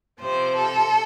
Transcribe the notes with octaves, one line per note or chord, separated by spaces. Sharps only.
C3 F3 C4 C5
A4